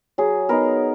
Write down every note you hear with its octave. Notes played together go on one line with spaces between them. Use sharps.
F#3 G#4
B3 D#4 A#4